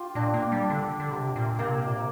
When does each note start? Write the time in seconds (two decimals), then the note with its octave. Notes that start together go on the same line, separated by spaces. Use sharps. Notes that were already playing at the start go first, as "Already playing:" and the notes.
Already playing: F4 G4
0.15 A#2 D4
0.34 A#3
0.52 G3
0.70 D3
1.00 D3
1.12 C3
1.36 A#2
1.59 C3 A#3
1.87 A#2
1.95 C3